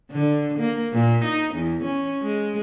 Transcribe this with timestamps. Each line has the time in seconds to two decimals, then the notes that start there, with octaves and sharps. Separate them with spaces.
0.12 D3
0.59 A#3
0.93 A#2
1.25 D#4
1.55 E2
1.84 C#4
2.23 G#3